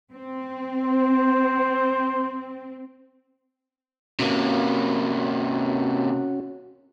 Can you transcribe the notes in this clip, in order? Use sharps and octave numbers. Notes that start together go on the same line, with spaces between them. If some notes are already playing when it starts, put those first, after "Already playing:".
C4
C5
C3 A#3 C#4 F#4